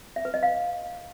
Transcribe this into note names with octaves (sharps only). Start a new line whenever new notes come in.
E5
B4
D#5
F5